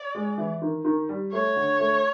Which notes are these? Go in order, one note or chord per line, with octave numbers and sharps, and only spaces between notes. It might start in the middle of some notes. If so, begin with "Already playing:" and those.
Already playing: D5
G#3
E3
D#3
D#3
G3
A3 C#5
D3
A3